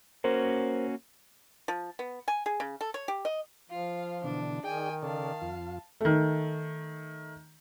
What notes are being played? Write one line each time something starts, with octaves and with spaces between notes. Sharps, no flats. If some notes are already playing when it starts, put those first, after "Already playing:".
A#3 C#4 F#4 A#4 C5
F3
B3
G#5
G#4
C#3
A4
C#5
G4
D#5
F3 F4 F5
B2 D3 E3 D4
D#3 D#4 G#4 D5 G5 G#5
C#3 A4 D5 F5 A5
F2 F4
D#3 A3